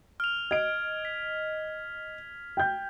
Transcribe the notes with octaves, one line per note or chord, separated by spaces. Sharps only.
F6 F7
D#5 G#6 D7
B6
G5 G6